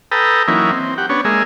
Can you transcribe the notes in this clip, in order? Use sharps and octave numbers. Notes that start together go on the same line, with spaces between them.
A4 B4 G5 A#5 D#6 E6
E3 F#3 A#3 C#4 D#4 E4
C4
G4 F#5
B3 C#4 D4 C#5
G#3 A#3 G#4 D#5 E5